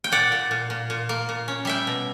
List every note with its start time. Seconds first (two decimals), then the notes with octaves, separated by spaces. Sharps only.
0.04 G5
0.12 A#2 D5 F#5
0.32 A#2
0.51 A#2
0.70 A#2
0.90 A#2
1.09 A#3
1.29 A#2
1.48 C#4
1.65 G3 E5 G5
1.87 B2